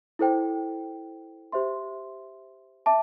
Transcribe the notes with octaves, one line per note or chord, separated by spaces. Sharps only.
E4 A4 C5 G5
G4 C5 E5 C6
E5 A5 D6